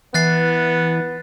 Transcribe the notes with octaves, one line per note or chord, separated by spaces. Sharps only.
E3 B3 F#6 A6 C7